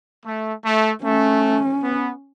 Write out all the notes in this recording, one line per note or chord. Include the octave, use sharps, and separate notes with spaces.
A3
A3
A3 C#4
B3